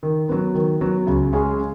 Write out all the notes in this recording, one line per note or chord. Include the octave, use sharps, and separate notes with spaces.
D#3
F#3 B3
D#3
F#3 B3
C#2
C#3 G#3 C#4 G#4